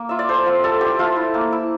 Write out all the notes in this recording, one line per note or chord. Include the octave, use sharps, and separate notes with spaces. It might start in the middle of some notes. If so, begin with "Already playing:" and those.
Already playing: A#3
F4 E5
D5
A3 C5
C4 F4
G3 A4
D4 F4 G4
A3 F4
E4
A#3
E4